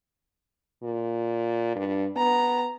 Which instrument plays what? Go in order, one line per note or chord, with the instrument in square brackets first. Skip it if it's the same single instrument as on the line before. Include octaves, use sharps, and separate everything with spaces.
[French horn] A#2
G2
[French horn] B3 [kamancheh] A#5